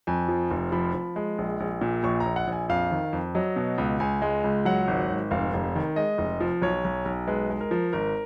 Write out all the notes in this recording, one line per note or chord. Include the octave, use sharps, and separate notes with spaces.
F2 G#5
F3
F1
F3 B5
F3
G#3
A#1
A#1
A#2
A#1 C#6
A#5
A#1
F#5
A#1
G#5
F2 F5
D#3
F2
F#3 D#5
B2
C#2
C#2 G#5
G#3
C#2
F#3 F#5
G#1
G#1
F1 F5
F1
D#3
G#3 D#5
F1
F3
B1 C#5
B1
B1
G#3 B4
G#3
A#4
F3
G#1 A#4